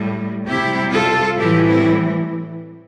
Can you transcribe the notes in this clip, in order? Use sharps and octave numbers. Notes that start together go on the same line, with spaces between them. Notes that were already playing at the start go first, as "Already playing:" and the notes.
Already playing: A2 G3
C3 G3 E4 G4
F4 A4
A2 E3 G3 E4 G4
C4 E4